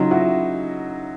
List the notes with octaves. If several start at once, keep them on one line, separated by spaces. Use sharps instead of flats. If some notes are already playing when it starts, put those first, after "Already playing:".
Already playing: C#3 F#3 D#4 F4
E4 F#4